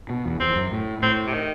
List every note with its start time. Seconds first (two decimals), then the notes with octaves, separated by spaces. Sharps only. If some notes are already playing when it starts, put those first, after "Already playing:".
0.10 B2
0.26 E2
0.40 E2 C4
0.56 F#2
0.72 A2
1.03 A2 C4
1.27 C3
1.33 D#3